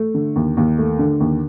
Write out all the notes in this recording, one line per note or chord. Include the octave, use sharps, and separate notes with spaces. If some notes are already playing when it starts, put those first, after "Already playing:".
Already playing: A3
D3
D#2
D#2
A3
D3
D#2